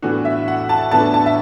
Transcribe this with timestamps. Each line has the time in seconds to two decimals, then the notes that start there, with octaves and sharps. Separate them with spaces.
0.02 A2 E3 B3 D4 F#4
0.25 E5
0.48 F#5
0.69 A5
0.91 A2 E3 B3 D4 A5
1.14 A5
1.26 E5